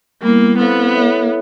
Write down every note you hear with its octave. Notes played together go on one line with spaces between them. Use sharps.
G3 A#3 B3 E4
B3 C4 E4 A4 C5 F5
E4 A4 C#5 E5